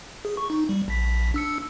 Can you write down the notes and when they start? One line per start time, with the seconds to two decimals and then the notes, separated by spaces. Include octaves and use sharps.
0.25 G#4
0.37 C#6
0.50 D#4
0.69 G3
0.88 A#1 B6
1.34 D4 E6 C#7